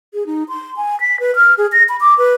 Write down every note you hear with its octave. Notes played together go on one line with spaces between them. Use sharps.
G#4
D#4
C6
G#5
B6
B4
F6
G#4
A#6
B5
D6
B4